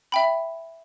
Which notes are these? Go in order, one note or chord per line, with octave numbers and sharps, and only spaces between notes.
E5 G5 B5